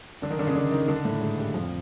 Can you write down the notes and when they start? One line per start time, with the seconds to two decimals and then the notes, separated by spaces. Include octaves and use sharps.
0.22 D3 D4
0.30 D#3 D#4
0.39 D3 D4
0.47 C#3 C#4
0.55 D3 D4
0.71 D#3 D#4
0.88 D3 D4
1.05 A2 A3
1.21 G#2 G#3
1.38 G2 G3
1.54 F2 F3